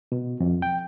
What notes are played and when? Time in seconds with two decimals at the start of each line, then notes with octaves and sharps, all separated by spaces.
0.12 B2
0.40 F2
0.62 G5